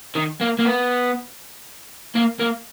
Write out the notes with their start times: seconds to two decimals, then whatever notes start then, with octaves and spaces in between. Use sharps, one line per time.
0.15 D#3
0.41 A#3
0.59 A#3
0.65 B3
2.15 A#3
2.40 A#3